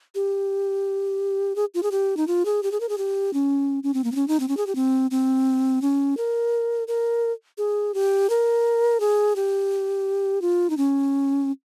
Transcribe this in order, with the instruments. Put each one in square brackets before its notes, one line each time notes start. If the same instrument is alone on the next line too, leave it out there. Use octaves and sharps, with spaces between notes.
[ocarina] G4
G#4
F4
G#4
G4
D#4
F4
G#4
G4
G#4
A#4
G#4
G4
C#4
C#4
C4
A#3
C4
C#4
D#4
C4
C#4
G#4
G4
C4
C4
C#4
A#4
A#4
G#4
G4
A#4
G#4
G4
F4
D#4
C#4